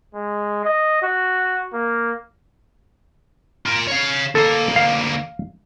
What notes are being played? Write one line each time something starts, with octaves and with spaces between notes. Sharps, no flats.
G#3
D#5
F#4
A#3
F4 A#4
C#5 F5
D2 A#3 A4
F5